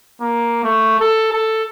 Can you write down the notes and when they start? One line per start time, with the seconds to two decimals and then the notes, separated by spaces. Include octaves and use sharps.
0.21 A#3
0.64 A3
1.00 A4
1.33 A4